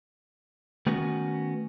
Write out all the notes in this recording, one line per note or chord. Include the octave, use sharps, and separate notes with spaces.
D#3 A3 B3 C#4 F#4